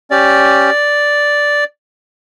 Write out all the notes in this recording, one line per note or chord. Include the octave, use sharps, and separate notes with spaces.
C#4 G4 D5